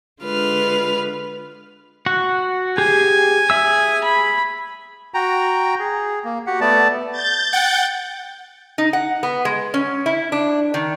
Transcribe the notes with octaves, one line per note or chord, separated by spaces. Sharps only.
D3 G#3 F4 B4 F6
F#4 F#5
G4 G#4 G#5
G#4 E5 E6
B5
F#4 G5 A#5
G#4
A#3
F#4 G4 F#5
A3 B3 D5 A5
G6 A6
F#5 G5
D#4
F#5
B3
G#3
C#4
E4
D4
D#3